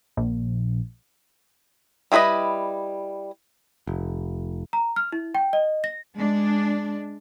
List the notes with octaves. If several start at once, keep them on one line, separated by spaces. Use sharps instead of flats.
A#1
G3 E4 G#4 B4 D#5
F1
A#5
F6
E4
G5
D#5
A#6
G#3 D4